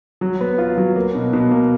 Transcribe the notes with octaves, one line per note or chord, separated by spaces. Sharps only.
F#3
B3
F4
F#3
A#3
B2
B2
A#3